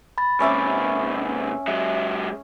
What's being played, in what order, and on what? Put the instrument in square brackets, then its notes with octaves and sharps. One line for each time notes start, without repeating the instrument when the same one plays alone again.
[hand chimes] B5 A6
[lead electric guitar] G#2 C3 [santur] C#4 E5 D6
[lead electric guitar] F#3 G#3 [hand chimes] E5